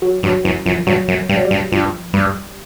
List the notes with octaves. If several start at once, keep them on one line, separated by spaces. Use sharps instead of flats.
F#3
G2 F#3
F#2 E3
F#2 F3
G2 F#3
F#2
G2 G3
F#3
G3
G2
G2 F3
G2 G3